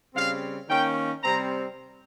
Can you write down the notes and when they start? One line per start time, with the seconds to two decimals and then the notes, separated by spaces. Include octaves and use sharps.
0.15 C#3 G3 C4 F5
0.69 D#3 A#3 C#4 G5
1.23 C3 G3 C4 A#5